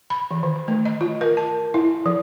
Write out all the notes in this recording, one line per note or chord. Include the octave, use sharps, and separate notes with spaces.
B5
E3
D#3
A3
D#5
F4
A#4
A5
E4
F3